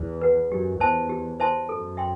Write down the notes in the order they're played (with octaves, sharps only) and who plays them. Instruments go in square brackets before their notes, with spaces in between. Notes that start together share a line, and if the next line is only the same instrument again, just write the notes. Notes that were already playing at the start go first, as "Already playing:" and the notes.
Already playing: [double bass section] E2
[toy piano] B4 F#5
[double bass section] F#2 [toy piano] G4
[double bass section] E2 [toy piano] C5 E5 A5 C6
[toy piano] G4
C5 E5 A5 C6
[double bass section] F#2 [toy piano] A4
[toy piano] E5 G5 C6